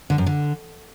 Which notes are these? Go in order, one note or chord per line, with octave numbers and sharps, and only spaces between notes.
D3
F#2
D3